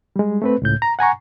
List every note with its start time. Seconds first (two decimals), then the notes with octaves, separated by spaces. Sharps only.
0.16 G3 G#3
0.42 A3 C4 B4
0.62 C#2 A2 G6
0.82 A#5
0.99 F#5 G#5 A#5 C#6